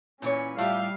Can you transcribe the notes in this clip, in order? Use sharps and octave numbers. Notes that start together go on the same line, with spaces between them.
A#2 E3 C#4 C#5
A2 G3 F4 G4 E5 F5